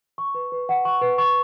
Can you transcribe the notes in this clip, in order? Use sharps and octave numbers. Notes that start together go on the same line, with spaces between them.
C#6
B4
B4
F#5
C#6
B4
C#6